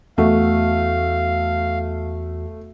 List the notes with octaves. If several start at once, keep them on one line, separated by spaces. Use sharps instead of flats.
E2 A3 F#4 F5